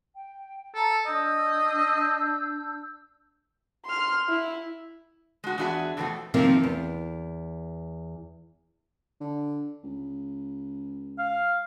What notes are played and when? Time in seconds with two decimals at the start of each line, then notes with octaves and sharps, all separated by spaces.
0.14 G5
0.75 A4 A#5
1.06 D4 D#5 E6 G6
3.86 C6 F6
4.29 E4
5.44 G#3 F#4
5.58 E2 D4 F#4 G#4 E5 G#5
5.97 F2 B2 E3 A3 C4 F#4
6.34 C3 D#3 F3 A#3 C4
6.63 E2
9.21 D3
9.83 C#2
11.19 F5